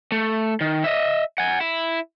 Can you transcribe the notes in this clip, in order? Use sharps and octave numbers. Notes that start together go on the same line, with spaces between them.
A3
D#3
D#5 E5
F#5 G#5
E4